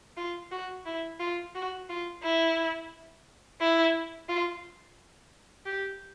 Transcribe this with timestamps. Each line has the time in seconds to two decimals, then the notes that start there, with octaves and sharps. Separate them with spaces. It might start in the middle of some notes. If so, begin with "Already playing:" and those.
0.17 F4
0.51 F#4
0.86 E4
1.20 F4
1.55 F#4
1.89 F4
2.23 E4
3.61 E4
4.29 F4
5.66 G4